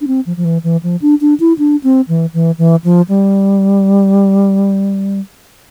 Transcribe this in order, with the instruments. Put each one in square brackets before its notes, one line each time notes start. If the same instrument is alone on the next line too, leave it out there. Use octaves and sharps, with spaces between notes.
[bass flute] D4
C4
F3
F3
E3
E3
F3
D4
D4
E4
D4
C4
E3
E3
E3
F3
G3